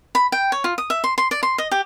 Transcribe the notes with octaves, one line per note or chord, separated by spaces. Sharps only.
B5
G5
C#5
F4
D#6
E5
C6
C6
D5
C6
D#5
G4